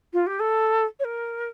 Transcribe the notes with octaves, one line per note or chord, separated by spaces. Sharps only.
F4
G4
A4
C#5
A#4